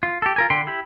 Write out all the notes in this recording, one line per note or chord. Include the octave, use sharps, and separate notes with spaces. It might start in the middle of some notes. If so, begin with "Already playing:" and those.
F4
G4 A4
F4 A#4 G#5
D3 G5 B5 C6
E4 G4 B5